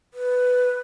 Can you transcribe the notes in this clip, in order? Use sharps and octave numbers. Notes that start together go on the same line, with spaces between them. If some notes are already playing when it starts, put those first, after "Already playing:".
B4